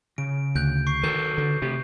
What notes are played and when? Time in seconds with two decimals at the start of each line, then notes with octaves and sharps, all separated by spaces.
0.18 C#3 D7
0.55 D2 F#6 G6 D7
0.87 C#6 C7
1.03 D#3 F#4 A4 B4 G6
1.38 D3
1.62 C3 A3 G4